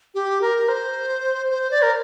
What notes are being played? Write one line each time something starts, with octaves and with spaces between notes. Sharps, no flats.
G4
A#4
C5
C5
D5
A#4